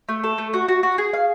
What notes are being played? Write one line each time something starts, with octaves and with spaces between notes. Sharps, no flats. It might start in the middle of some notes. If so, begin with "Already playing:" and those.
A3
A4
A3
F#4
F#4
F#4
G#4
F5